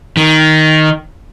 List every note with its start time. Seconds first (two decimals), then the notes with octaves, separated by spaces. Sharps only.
0.17 D#3